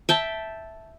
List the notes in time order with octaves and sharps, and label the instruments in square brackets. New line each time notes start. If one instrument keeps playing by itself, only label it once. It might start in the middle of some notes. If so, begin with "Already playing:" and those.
[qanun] E5 G5 A5